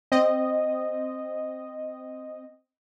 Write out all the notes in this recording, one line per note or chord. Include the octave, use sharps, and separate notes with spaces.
C4 D#5